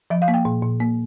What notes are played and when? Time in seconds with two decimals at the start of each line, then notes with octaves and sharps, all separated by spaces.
0.10 F3 E5
0.22 F5
0.28 A#3
0.34 G5
0.45 A#2
0.63 A#2
0.80 A#3